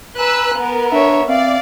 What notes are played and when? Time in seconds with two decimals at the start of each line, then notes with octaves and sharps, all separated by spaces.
0.18 B4 G#5 A#5 E6 F#6
0.57 B3 A#4
0.92 D4 C#5 E5
1.28 C4 D5 E5 F5